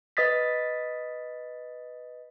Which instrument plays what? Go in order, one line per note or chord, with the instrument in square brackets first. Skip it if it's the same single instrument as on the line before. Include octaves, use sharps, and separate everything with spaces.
[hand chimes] B4 D#5 D#6 A6 B6